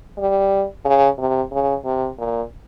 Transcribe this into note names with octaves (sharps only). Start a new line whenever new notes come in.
G3
C#3
C3
C#3
C3
A#2